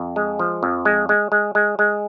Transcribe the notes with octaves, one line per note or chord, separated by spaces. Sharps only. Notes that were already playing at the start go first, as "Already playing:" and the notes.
Already playing: F2
G#3
F3
F2
G#3
G#3
G#3
G#3
G#3